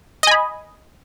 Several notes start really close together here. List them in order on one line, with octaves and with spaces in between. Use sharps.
D#5 G#5 B5